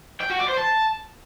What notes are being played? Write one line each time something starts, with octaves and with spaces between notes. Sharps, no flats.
G5
F#4
D5
C5
A5